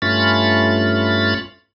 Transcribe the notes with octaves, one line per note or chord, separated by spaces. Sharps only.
G2 A3 C#4 F4 B5 A6